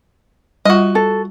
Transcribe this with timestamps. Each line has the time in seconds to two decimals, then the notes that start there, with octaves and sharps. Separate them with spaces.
0.65 G3 F4 F#4 D#5
0.95 A4